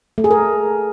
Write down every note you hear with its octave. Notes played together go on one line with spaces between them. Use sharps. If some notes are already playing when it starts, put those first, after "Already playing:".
A3
G#4
A#4